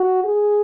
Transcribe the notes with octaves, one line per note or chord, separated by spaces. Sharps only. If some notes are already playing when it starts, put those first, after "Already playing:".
Already playing: F#4
G#4